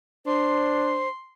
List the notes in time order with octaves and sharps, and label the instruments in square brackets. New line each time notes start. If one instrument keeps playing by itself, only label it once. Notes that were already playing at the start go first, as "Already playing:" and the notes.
[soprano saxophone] D4 [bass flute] C5 [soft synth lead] C6